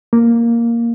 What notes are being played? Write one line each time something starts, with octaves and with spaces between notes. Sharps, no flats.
A#3